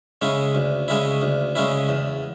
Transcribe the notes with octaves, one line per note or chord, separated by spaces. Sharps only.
C#3 G#3 C#4 E4
D2
C#3 G#3 C#4 E4
D2
C#3 G#3 C#4 E4
E2